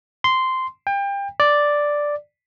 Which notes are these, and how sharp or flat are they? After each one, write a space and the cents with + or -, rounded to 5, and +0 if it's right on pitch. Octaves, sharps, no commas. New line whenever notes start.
C6 -10
G5 +30
D5 +0